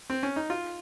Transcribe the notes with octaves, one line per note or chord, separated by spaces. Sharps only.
C4
C#4
D#4
F4